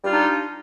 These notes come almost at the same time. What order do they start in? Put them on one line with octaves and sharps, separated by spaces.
G3 F4 D4 D#4